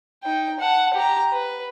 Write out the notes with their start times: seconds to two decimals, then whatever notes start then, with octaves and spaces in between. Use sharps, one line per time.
0.23 D#4 G5
0.59 F#5 A5
0.94 G4 A#5
1.32 B4